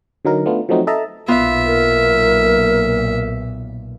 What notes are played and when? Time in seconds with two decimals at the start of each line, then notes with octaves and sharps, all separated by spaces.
0.25 D3 F#3 D#4 A#4
0.46 A3 B3 D4 F4
0.69 F3 F#3 A3 C4 D#4 F#4
0.87 A4 D#5 E5 A5 A#5
1.28 B1 A#2 B3 F4 E5
1.66 A#4